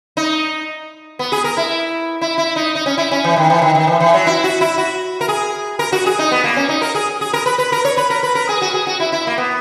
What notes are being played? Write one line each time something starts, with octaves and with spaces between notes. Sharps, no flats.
D#4
B3
G#4
A#4
E4
E4
E4
D#4
D#4
C#4
E4
C#4
E3
D#3
E3
D#3
D#3
E3
E3
F#3
E4
F#4
E4
F#4
A#4
G#4
A#4
F#4
G#4
D#4
B3
A#3
C#4
D#4
A#4
G#4
G#4
A#4
B4
B4
A#4
C#5
B4
A#4
B4
A#4
G#4
F#4
G#4
F#4
E4
E4
A#3
B3